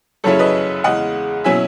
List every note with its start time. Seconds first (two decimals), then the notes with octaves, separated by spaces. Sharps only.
0.24 F#2 C#3 F#3 C#4 E4 A4 C#5
0.39 B4 D#5
0.84 E2 C#3 G#3 D#5 F#5
1.44 B2 F#3 C#4 E4 E5 G#5